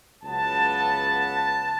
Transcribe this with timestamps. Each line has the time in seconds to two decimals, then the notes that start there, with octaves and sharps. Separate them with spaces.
0.23 C#2 C#3 F#3 B3 A5